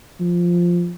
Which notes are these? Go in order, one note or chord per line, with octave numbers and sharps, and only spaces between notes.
F3